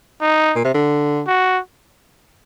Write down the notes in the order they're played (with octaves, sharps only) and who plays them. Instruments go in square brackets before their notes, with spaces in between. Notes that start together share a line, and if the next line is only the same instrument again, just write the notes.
[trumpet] D#4
[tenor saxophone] A#2
C3
D3
[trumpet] F#4